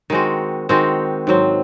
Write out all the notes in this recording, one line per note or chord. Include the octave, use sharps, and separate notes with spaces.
D#3 G#3 C4 F#4
D#3 G#3 C4 F#4
G#2 F#3 C4